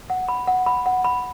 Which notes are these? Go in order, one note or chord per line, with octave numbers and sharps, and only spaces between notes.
F#5
B5
F#5
B5
F#5
B5